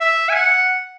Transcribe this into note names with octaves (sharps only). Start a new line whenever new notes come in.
E5
G#5
F#5